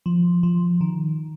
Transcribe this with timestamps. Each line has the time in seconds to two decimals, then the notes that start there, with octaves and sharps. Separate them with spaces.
0.06 F3
0.43 F3
0.81 D#3